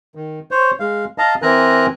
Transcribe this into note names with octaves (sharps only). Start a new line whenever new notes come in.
D#3
C5 C#5
G#3 F5
D#5 F5 A5 A#5
E3 C4 A#4 G#5 A#5 F#6